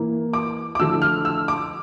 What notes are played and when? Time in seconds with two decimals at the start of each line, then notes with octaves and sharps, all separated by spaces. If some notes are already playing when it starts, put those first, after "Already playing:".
Already playing: E3 A#3 E4
0.33 D6
0.75 D6
0.80 D3 F3 A3 E4 E6
1.02 F6
1.25 E6
1.48 D6